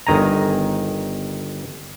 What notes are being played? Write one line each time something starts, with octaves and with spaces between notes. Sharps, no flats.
G1 D#3 G#5 A#5